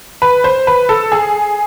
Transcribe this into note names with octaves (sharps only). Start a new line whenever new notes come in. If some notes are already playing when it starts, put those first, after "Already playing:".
B4
C5
B4
A4
G#4